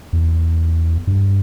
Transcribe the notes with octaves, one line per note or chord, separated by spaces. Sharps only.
E2
G2